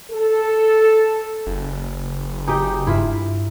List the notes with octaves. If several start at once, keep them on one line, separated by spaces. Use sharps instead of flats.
A4
F#1
D#4 G4 D#5 G#5
G2 E4 F4 E5